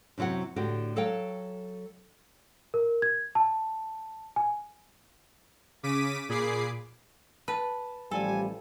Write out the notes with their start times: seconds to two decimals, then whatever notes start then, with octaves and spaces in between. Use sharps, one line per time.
0.18 F#2 C3 F#3 E4 F#5
0.56 A2 D3 F#4 G4
0.96 F#3 A4 C#5 F5 G5
2.74 A#4
3.02 G#6
3.35 A5
4.36 G#5
5.83 C#3 D6 B6 D#7
6.29 A#2 G#4 B5 D6 C7
7.48 B4 A5
8.11 A1 F3 G3 A4 G#5